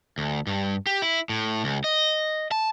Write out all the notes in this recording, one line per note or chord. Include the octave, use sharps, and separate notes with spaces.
D2
G2
G4
E4
A2
C#2
D#5
A5